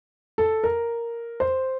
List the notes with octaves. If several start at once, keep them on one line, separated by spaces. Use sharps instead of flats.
A4
A#4
C5